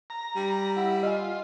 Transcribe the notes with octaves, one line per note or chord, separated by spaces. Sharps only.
A#5
G3
E4 F#5
F4 D#5 G#5